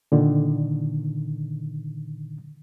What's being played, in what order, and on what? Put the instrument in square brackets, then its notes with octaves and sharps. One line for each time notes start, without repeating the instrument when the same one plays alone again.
[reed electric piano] A#2 D3 D#3